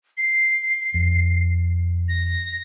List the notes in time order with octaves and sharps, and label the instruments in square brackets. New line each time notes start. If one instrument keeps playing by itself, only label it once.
[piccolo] C7
[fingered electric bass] F2
[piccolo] A#6